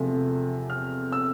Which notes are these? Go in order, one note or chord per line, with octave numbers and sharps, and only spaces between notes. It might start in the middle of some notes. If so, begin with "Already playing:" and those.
Already playing: E2 C3 F3 A3
F6
E6